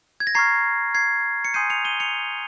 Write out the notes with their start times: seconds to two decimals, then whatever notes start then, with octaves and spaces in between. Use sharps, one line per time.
0.20 G#6
0.27 A#6
0.35 A#5 C#6 F6 G#6 C7
0.94 G#6 C7
1.45 C#7
1.54 G#5 C6 D#6 G6 C7 D#7
1.70 C#7 F7
1.85 D#7 G7
2.00 C#7 F7